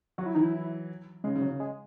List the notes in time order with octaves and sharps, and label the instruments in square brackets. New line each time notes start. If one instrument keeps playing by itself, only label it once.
[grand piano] F#3 [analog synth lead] F#4
[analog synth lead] E4
[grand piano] E3 [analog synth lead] D#4
[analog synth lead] E4
[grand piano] C#3 [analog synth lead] G#3
[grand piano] C#3
[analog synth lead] F#3
[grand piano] C#3
[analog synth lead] G#3